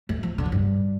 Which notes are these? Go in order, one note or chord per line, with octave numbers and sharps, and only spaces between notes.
A3
F3
D3
A2
G2